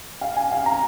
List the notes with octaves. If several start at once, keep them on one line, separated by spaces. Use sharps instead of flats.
F5
G#5
F5
A#5